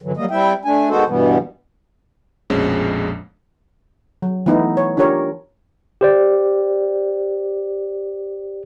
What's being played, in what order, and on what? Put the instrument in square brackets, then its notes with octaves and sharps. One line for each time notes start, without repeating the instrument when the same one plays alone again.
[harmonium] G2 D3 E3 F#3
F#3 G3 A#3 D#5
G3 C4 E4 E5 G5
A3 D4 G#5
D#3 G#3 B3 F#4 A4 C5
G2 B2 E3 G3 B3
[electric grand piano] A#1 F2 B2 G#3 C4 C#4
[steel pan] F#3
E3 A3 B3 D#4 E4
C#5
D4 F4 G4 A#4 C#5
[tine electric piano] G4 C5 D5